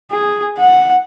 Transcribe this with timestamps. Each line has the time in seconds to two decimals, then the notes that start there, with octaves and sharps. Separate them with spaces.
0.11 G#4
0.58 F#5